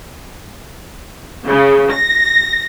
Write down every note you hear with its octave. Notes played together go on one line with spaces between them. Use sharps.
C#3
A#6